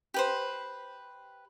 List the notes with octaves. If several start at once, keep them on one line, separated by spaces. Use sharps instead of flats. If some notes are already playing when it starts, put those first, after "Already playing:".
G4 B4 C5